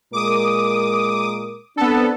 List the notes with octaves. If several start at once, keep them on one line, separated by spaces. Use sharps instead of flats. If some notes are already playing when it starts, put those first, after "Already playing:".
A#2 G#3 A#4 D6 D#6
B3 C4 D4 A4